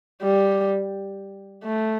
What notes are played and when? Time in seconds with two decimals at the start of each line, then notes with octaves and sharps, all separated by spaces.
0.23 G3
1.64 A3